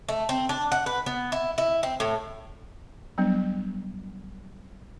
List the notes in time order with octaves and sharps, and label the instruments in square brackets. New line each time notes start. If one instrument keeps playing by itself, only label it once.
[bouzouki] A3
C4
D4
F#5
B4
B3
E4
E4
C4
A2
[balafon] F#3 G3 B3 D4